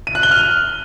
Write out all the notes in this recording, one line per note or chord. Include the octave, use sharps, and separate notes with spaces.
D#7
F#6
G7
F6